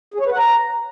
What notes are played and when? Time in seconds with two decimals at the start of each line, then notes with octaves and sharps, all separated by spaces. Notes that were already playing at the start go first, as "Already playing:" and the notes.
0.14 G#4
0.20 C#5
0.26 B4
0.32 F#5
0.38 A#5